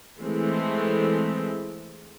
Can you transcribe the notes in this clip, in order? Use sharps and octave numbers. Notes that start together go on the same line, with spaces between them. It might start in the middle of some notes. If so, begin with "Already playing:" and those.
E3 G#3 A3 C4